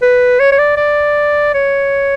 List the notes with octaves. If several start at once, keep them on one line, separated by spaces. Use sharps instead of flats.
B4
C#5
C#5
D5
D5
C#5